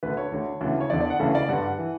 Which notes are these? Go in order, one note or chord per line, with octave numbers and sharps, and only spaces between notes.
D2 D3 B4
C#5
D2 D3
D2 C#3 E3
C#5
E2 D3 D5
D5
F#5
D2 C#3 E3 A4
D5
G2 D3 F#5
F#5
E3